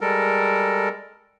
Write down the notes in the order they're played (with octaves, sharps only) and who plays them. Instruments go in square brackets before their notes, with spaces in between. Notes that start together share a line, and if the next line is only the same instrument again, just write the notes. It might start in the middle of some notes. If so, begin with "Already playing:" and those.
[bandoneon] G3 G#3 A4 A#4